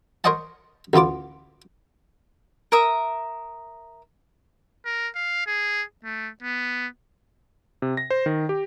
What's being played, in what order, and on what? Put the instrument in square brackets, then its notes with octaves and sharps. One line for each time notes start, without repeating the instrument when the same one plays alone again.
[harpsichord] A#4 C5 C#5 D#5 F#5 A5
A1 D2 B3 F4 D6
[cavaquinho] A#4 E5 D#6
[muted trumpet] A#4
F5
G#4
A3
B3
[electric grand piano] C3
A#6
C5
D#3
G4